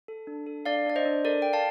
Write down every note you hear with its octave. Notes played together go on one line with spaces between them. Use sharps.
A4
D4
A4
D4 D5 F5
D4 D5
C5 D#5
D4
A4 A#4 D5
A4 G5
F5 A5